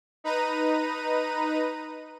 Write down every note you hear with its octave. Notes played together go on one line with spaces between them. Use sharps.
D#4 B4 A#5 D#7